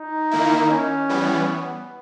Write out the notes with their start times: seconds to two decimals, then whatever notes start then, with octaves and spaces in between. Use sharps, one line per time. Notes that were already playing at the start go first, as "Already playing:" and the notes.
Already playing: D#4
0.31 D#3 A#3 E4
0.70 C#4
1.09 E3 G3 B3
1.48 B3